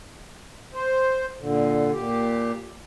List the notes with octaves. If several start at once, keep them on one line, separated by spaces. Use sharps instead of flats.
C5
A#2 D3
A#2 G4